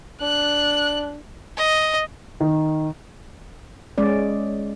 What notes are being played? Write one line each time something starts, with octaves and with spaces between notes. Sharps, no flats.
D4 F#6
D#5
D#3
G#3 C#4 D5